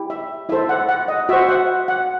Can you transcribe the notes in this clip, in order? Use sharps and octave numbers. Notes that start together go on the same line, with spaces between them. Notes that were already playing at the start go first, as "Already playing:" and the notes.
Already playing: E4 G4
E5
E4 A4 C5 E5
F#5
F#5
D#5
F#4 C5 E5
F#5
F#5